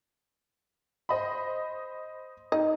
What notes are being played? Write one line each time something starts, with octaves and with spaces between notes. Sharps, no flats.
C5 D#5 B5
D#4 D#5